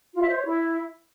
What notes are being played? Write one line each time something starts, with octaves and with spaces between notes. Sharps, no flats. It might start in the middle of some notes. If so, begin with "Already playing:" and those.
F4
E5
C5
C#5
E4